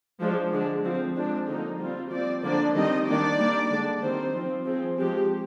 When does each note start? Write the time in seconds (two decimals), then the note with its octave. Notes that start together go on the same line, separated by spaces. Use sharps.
0.20 F3 G#3 D4
0.52 D3 G#3 D4
0.84 F3 C4
1.16 F3 G#3 C4 D4
1.48 D3 F3 A#3 D#4
1.79 G3 C4 F4
2.11 F3 C4 D5
2.43 D3 F3 A#3 D4 D5
2.74 D#3 G3 C4 D#5
3.07 D#3 A#3 D4 D5
3.38 G3 A#3 D4
3.70 D3 G#3 D4
4.02 D#3 G3 C4 C5
4.34 F3 C4
4.65 F3 C4 G#4
4.98 F3 G#3 C4 G4